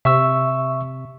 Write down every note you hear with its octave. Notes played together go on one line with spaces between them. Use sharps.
C3 E5 C#6 E6